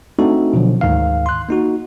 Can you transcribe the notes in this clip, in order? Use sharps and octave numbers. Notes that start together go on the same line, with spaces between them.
A3 C4 D4 D#4 F#4 A4
B2 D3 F3 F#3
D2 G#2 D#3 F5
C6 F#6
A#3 D#4 F#4